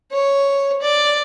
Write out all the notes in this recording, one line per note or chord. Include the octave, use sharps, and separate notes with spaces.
C#5
D5